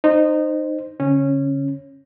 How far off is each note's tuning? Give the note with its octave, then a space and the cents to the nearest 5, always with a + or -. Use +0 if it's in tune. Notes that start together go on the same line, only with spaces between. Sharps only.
D#4 -20 C5 +0
D3 -45 C#4 -15